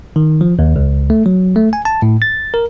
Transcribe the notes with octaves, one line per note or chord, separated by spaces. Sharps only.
D#3
F3
D#2
C#2
A3
F#3
A3
G#5
A5
A2
A6
A#4